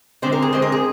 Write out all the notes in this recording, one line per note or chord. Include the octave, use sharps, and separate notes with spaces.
D3 G#3 C4 C5
A#4
G#4
D3 G#3 C4 C5
A#4
G#4